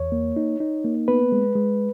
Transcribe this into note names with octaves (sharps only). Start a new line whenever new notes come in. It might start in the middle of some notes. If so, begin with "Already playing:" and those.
Already playing: E2 C#5
A#3
D#4
D#4
A#3
B3 B4
G#3
G#3